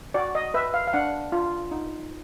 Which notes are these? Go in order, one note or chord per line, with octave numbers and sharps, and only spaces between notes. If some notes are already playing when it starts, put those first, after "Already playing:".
F#4 D5
D#5
B4 E5
F5
F5
D4 F#5
F4
D#4